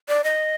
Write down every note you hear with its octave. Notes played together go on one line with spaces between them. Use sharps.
D5
D#5